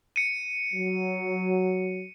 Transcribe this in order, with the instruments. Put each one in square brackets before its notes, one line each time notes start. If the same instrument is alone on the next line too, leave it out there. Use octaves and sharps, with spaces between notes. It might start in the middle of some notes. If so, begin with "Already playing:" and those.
[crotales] C#7 D#7
[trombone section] F#3